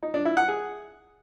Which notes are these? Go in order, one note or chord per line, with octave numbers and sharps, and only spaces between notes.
D#4
D4
E4
F#5
G#4